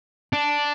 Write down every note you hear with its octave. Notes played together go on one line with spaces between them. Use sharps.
D4